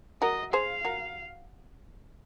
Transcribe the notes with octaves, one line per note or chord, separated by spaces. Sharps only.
F#4 A#4 D#5
G#4 C5 F5
F#4 A#4